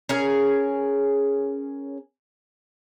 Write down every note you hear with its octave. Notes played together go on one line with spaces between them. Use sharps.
C#4 G#4 A#4